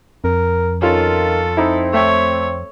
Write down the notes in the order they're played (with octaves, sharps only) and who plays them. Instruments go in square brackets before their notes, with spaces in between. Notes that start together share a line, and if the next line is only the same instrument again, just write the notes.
[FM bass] F2 [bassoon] A#4
[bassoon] D#3 [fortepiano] C#4 F4 [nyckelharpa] A4
[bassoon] C4 [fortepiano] D#4 E4
[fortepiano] A3 E5 G5 [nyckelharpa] C#5